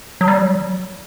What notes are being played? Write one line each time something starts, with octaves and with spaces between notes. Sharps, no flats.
F#3
G3
F#3